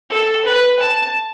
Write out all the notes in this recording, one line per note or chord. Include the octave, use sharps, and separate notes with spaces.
A4
B4
A5